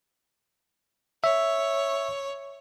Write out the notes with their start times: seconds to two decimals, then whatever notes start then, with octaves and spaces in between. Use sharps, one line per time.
1.24 C#5 E5